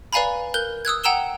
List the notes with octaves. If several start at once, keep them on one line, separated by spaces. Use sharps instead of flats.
B4 D5 F5 G#5 A#5 B5
A#4 F#6 G6 G7
D#6 E6 F#6 G#6
F#5 G5 A#5 E6 E7 G7